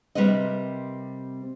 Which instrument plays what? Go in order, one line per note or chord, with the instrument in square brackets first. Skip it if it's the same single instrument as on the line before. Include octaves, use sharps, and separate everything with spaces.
[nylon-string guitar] C3 G3 C4 A#4 B4 D#5